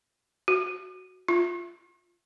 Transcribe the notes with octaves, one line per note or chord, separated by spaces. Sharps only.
F#4
F4